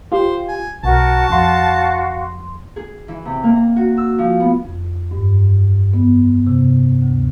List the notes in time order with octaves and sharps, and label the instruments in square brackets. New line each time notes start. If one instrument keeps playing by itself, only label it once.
[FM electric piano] F4 G4 [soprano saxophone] C5
[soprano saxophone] G#5
[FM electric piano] B1 [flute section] F#4 A#4 [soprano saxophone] A5
[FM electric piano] F2 C6 [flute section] F#4 F5
[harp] G#4
E3
C3
A#3
A#5
F#4
E6
F3
B3
[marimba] F2
G2
B3
C3
D2